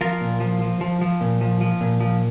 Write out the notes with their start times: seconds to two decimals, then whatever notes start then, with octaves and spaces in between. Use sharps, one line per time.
0.01 F3 F4 A#4
0.21 A#2
0.40 F3
0.61 F3
0.81 F3
1.01 F3
1.21 A#2
1.41 F3
1.61 F3
1.81 A#2
2.01 F3